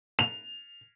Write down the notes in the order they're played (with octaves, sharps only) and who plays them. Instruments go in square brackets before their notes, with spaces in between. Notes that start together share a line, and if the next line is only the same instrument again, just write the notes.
[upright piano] F7